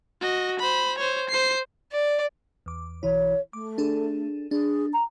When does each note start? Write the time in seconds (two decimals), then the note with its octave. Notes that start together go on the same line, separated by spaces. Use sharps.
0.21 F#4 D#5
0.59 C5 B5
0.98 C5 C#5
1.29 C5 C7
1.92 D5
2.66 E2 D6
3.03 B1 E3 E4 C#5
3.53 A3 D6
3.78 D4 G#4 A4
4.51 D4 G#4
4.93 A#5